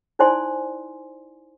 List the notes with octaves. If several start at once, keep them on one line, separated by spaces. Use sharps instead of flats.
D#4 E4 C5 D5 G#5 C6